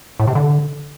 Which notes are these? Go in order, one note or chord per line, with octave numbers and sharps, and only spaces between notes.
A2
C3
D3